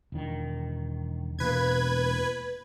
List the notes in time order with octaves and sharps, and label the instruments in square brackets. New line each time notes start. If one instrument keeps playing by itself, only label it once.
[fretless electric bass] E1 D#3
[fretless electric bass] E1 B2 A#3 [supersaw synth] B4 G#6